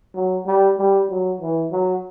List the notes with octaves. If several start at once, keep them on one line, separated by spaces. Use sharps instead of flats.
F#3
G3
G3
F#3
E3
F#3